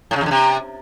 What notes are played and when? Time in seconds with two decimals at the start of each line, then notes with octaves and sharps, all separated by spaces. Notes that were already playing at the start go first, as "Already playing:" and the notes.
0.11 A2
0.16 C#3
0.21 E2
0.26 D3
0.31 C3